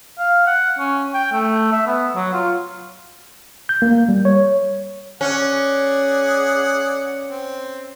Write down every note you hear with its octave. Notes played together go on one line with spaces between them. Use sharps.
F5
F#5
C#4
G5
A3
E5
B3
F#3
F4
G6
A#3
G3
C#5
C#4 G#4 D5 F#5
C4